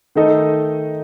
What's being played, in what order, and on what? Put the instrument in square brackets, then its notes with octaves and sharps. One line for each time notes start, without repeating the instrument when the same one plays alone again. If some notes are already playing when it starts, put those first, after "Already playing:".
[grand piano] D#3 A3 D#4 A4 D#5